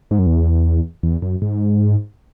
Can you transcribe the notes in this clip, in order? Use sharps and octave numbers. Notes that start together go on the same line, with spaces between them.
G#2
F#2
E2
E2
F#2
G#2